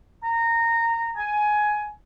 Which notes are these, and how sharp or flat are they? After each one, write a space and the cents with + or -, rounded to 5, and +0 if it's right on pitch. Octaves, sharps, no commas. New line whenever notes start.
A#5 -15
G#5 +15